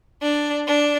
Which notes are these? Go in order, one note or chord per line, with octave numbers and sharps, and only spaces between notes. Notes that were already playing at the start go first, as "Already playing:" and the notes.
D4
D4